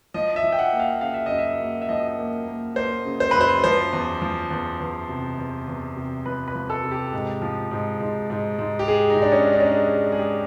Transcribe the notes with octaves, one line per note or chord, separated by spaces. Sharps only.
F3 D#5
E5
F3
G5
F#5
A#3
F5
C#3 F5
E5
F#2 D#5
E5
A#3
E5
F3 D#5
A#3
A#3
A#3 C5
C#3
C5
F#2 B4
C5
F3 C5
E2
F3
E2
E2
C3
E2
E2
C3
F3 B4
B4
F3
A4
C3
G4
G#2
F3
G#2
G#2
G#2
G#2
G4
G#3 G#4
D#4
G#2
D4
C#4
G#3
D4
C#4
D4
G#3
G#3
G#4
G4